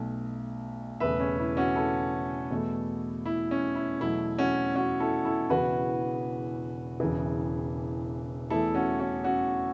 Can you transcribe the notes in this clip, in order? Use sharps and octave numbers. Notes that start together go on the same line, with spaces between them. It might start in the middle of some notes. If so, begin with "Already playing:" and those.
Already playing: B1 B2 A3
E1 E2 C#3 A3 B4 E5
C#4
E4
C#4 F#4
E4 A4
E2 B2 A3
E4
C#4
E4
E2 B2 F#3 A3 E4
C#4 F#4
C#4 F#4
E4 A4
E4 A4
E1 E2 C#3 E3 F#4 B4
E1 E2 C#3 E3
E2 E3 A3 E4 A4
C#4 F#4
C#4 F#4
C#4 F#4